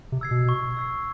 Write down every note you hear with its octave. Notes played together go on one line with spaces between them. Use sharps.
C3
E6 G#6 C7
B2
C#6
E6 G#6 C7